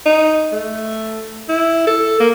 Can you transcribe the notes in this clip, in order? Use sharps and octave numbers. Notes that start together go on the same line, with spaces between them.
D#4
A3
E4
A4
A#3